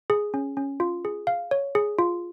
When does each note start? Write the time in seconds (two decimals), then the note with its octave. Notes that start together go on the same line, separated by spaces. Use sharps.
0.10 G#4
0.34 C#4
0.57 C#4
0.80 F4
1.05 G#4
1.27 F5
1.51 C#5
1.75 G#4
1.99 F4